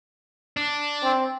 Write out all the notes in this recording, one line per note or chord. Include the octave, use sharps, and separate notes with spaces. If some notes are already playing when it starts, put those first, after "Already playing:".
D4
C4